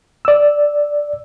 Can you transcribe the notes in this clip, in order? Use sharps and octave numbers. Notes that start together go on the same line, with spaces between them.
D5 E6